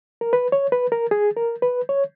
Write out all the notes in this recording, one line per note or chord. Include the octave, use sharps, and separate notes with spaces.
A#4
B4
C#5
B4
A#4
G#4
A#4
B4
C#5